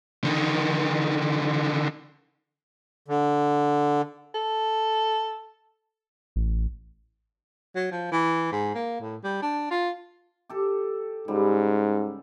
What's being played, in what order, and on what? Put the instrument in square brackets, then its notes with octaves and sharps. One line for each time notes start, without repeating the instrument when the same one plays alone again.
[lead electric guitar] D3 D#3
[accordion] D3
[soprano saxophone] A4
[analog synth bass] A1
[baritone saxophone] F#3
F3
E3
G#2
A#3
A2
G3
D4
F4
[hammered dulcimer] G4 A4
[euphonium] G#2 [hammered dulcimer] C#3 G3